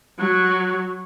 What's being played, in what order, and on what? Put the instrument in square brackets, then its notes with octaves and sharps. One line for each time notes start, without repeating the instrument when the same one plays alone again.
[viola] F#3